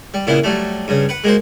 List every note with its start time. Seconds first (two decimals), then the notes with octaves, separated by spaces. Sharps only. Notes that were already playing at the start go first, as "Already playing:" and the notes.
0.14 G3
0.27 A#2 C#3 E3 B3 E4
0.44 F#3 G3 A3
0.88 G2 C#3
1.09 B4 F#5
1.24 G#3 A#3 F#4 C5